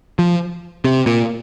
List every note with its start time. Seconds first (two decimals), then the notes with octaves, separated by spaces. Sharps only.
0.19 F3
0.84 C3
1.06 A#2